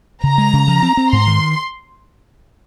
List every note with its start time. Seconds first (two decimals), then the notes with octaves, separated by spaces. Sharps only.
0.24 C#3 A#5
0.38 G#3
0.53 C#3
0.68 F3
0.82 C4
0.97 C4
1.12 G#2 C6
1.27 D#3